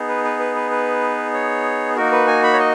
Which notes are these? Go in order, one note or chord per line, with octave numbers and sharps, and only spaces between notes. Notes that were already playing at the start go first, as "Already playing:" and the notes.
Already playing: B3 D#4 G#4
B4
B4
B4
B4
B4
C#5
A#3 D#4 F#4 A#4
B4
G#5
B5
C#5
D#5